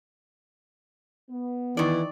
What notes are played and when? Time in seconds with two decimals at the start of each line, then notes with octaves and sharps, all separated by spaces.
1.30 B3
1.77 D#3 E3 D5